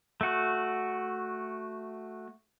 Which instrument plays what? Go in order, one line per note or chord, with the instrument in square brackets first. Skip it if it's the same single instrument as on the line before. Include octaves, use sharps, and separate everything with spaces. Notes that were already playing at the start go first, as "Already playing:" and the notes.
[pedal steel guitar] A3 F#4